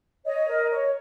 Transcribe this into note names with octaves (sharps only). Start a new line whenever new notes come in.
C#5 D#5
A#4
C#5